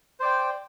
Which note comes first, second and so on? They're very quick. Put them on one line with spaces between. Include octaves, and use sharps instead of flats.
C5 D5 G5